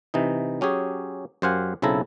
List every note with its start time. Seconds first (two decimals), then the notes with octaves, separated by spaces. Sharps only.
0.14 C3 E3 D#4
0.61 F#3 C#4 G4 G#4
1.42 F#2 G4 C5 F5 F#5 G#5
1.82 B1 C#3 C4 E4 A4 A#5